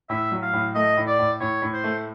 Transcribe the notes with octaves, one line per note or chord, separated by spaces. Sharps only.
A2 E5
F#3
F5
A2
A3 D#5
A2
D5
A2
A2 C#5
A2
C5
A3